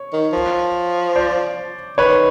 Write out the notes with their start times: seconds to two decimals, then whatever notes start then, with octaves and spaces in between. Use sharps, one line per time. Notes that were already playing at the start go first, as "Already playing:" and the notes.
Already playing: C#5
0.13 D#3
0.33 F3
1.16 C5 D5
1.97 D#3 B4 C#5